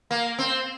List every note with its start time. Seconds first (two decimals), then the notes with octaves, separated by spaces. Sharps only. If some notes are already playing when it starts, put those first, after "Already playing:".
0.11 A#3
0.39 C4